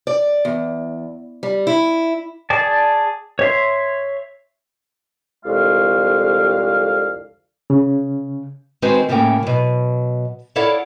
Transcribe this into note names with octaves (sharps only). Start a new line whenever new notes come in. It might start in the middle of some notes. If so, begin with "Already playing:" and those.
D5
E2
G3
E4
G#4 D5 A5
C#5 E5 C6
C2 F2 D3 G#3 F5
C#3
D#3 G#3 C4 F#4 B4 C5
A2 C#3 A3 A#3 G5
B2 F#3
E4 A4 C#5 D5 F5 F#5